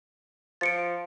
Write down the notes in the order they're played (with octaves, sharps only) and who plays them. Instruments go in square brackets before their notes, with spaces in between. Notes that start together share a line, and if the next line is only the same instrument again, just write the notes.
[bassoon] F3 [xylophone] A6 C#7 D7